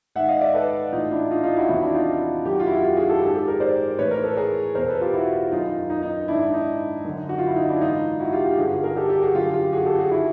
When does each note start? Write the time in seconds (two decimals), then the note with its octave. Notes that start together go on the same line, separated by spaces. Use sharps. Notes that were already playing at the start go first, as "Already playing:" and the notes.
0.15 G#2 D#3 E5 F#5
0.28 D#5 F5
0.41 D5 E5
0.54 A4 B4
0.92 A2 E3 D#4 F4
1.11 D4 E4
1.31 D#4 F4
1.43 D#4 F4
1.56 E4 F#4
1.68 E2 C3 D#3 E4 F#4
1.81 D4 E4
1.94 D#4 F4
2.45 F#2 G4
2.49 D#3 F#4
2.60 F4
2.67 E4 F#4
2.83 F4 G4
2.96 F#4 G#4
3.09 G4 A4
3.21 G#2 D#3 G4 A4
3.35 G4 A4
3.47 G#4 A#4
3.60 C5 D5
3.99 A2 E3 B4 C#5
4.11 A#4 C5
4.23 A4 B4
4.37 G#4 A#4
4.75 E2 B2 A#4 C5
4.88 A4 B4
5.01 F4 G4
5.13 E4 F#4
5.52 F#2 D#3 D#4 F4
5.90 D#4
6.02 D#4
6.28 D#3 D4 E4
6.33 G#2
6.54 D#4
7.05 F#2 D3
7.29 F#4
7.38 F4
7.47 E4
7.56 D#4
7.69 D4 E4
7.81 G#2 E3 D#4 F4
8.20 E4 F#4
8.32 F4 G4
8.45 F4 G4
8.58 G2 D3 F#4 G#4
8.83 G#4 A#4
8.96 G4 A4
9.09 G4 A4
9.22 F#4 G#4
9.34 F#2 D3 F4 G4
9.54 F4 G4
9.73 F#4 G#4
9.85 G4 A4
9.98 F#4 G#4
10.11 D#3 E4 F#4